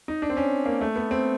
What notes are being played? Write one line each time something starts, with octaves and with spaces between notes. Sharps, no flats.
D#4
D4
C4
C#4
A#3
A3
B3
C4